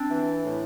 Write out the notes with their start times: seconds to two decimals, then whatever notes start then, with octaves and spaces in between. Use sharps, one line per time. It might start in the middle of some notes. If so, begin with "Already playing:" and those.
Already playing: C4 D4
0.09 E3
0.43 A2